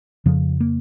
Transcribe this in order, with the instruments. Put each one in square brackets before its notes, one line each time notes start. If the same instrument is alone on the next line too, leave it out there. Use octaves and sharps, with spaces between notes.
[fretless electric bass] F2 C#3 F3
A#3